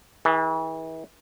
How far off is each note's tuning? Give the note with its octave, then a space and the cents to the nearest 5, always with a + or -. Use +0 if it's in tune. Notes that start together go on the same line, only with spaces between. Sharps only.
E3 -35 G#4 +0